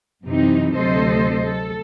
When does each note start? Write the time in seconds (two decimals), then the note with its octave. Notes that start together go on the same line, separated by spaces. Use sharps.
0.24 F#2 C3 E3 C4 D#4
0.75 D2 C3 F#3 A4 C5 D#5
1.46 A4